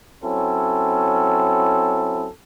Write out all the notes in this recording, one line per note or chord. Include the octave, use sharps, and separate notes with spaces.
F#3 C4 C#4 E4 A4